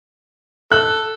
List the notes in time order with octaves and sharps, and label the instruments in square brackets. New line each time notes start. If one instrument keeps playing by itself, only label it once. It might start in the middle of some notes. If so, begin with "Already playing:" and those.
[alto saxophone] A4 [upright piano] F#6